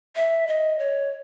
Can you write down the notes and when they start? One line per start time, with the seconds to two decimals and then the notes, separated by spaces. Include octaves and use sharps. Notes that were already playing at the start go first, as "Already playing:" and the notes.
0.16 E5
0.47 D#5
0.79 C#5